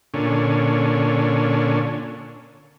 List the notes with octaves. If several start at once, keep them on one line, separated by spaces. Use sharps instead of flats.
A#2 D3 C#4